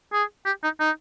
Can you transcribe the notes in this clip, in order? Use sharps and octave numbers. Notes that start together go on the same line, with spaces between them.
G#4
G4
D#4
D#4